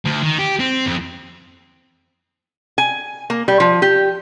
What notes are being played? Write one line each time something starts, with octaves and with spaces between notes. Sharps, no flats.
D2
D#3
G4
C4
F2
G#5
A#3
G3
F3
G4